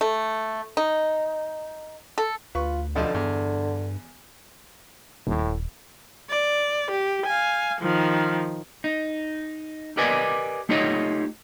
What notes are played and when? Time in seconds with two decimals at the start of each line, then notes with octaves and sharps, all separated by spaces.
0.01 A3
0.77 D#4
2.18 A4
2.55 D2 F4 B4 C#6
2.96 B1 D3 F3 D#5
3.14 E2 G2
5.27 D#1 A2
6.30 D5
6.91 G4
7.26 F5 G#5
7.81 D#3 F3
8.84 D#4
9.97 G4 A#4 B4 D5 D#5 G#5
10.69 A3 D#4 F4 G4 C#5 D#5